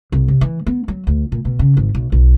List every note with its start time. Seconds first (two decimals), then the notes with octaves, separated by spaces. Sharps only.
0.12 C2
0.28 C3
0.41 E3
0.67 B3
0.88 F#3
1.07 D2
1.32 A#2
1.45 B2
1.59 C#3
1.77 G#1
1.95 B1
2.12 B1